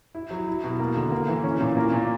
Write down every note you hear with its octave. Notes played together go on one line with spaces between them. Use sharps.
E4
F#3
E4
B2
A#3
D3
A#3
E3
C#4
A#2
A#3
A#2